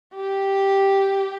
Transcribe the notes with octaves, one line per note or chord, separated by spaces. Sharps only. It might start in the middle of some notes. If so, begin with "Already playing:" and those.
G4